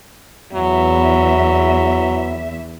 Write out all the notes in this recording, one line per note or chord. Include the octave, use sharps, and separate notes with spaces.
E2 F#3 E5